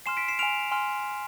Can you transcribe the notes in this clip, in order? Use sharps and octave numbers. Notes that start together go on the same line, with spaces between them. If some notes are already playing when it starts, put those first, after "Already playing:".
G#5 C6 F6 C7 E7
B6 D7
C7 E7
G#5 C6 F6 D7 F7
G#5 C6 F6